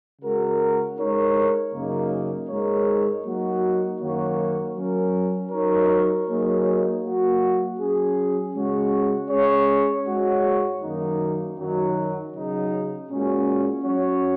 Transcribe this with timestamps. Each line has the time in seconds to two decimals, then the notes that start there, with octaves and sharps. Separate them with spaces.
0.22 C#3 G#3 F#4 A#4
0.98 G#3 D#4 A#4 C#5
1.74 F#2 C#3 A#3 D#4
2.49 G#2 G#3 D#4 A#4 C#5
3.24 F#3 A#3 D#4 F#4
4.01 F#2 D#3 A#3 F#4 C#5
4.76 F#3 C#4 A#4
5.51 F#3 D#4 A#4 C#5
6.28 F#3 A#3 D#4 G#4 C#5
7.03 F#3 A#3 F#4
7.79 F#3 C#4 G#4
8.55 C#3 G#3 C#4 F#4 C#5
9.30 G#3 C#4 G#4 C#5
10.06 G#2 G#3 F#4 C#5
10.81 F#2 D#3 A#3 D#4
11.57 F#2 D#3 F#3 D#4
12.33 C#3 F#3 D#4
13.09 A#2 G#3 C#4 F#4
13.84 F#3 C#4 F#4 C#5